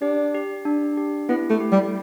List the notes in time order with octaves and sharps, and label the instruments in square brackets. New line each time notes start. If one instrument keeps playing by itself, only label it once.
[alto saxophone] D4 [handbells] G4
[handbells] G4
D4
G4
[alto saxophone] B3 [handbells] E4
[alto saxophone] A3
[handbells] G4
[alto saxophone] G3